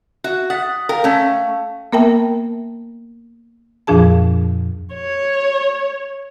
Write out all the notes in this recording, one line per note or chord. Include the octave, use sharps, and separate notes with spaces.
F#4 E5
F#5 D#6 A6 B6
A4 A#4 F5 G5
A3 C#4
A#3 B3 A#4 E5 G5 A5
F2 A#2 F3 D4 G#4 A5
C#5